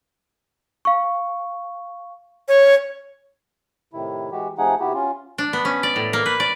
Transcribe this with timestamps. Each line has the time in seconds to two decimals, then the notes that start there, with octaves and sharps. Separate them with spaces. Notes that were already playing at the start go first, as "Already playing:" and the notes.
0.85 F5 C#6
2.48 C#5
3.93 A2 C3 D#3 E4
4.32 E3 G#3 F#4 G4
4.58 C3 F3 A3 D#4 G#4 F#5
4.80 C3 B3 E4 F#4 G4
4.94 C#4 F4
5.38 D4
5.53 B3
5.65 C#4
5.83 D5
5.96 A2
6.13 A#3
6.26 B4
6.40 D5